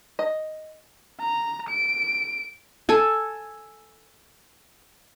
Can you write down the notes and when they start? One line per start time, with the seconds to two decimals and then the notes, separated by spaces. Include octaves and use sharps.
0.19 D#5
1.20 A#5
1.69 D7
2.89 A4 G#5